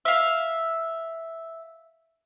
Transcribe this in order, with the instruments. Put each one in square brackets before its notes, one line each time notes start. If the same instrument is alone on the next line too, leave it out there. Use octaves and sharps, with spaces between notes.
[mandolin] E5 F5